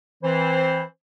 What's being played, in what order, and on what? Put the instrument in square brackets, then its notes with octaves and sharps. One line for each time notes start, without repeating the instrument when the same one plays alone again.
[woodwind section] E3 C4 C5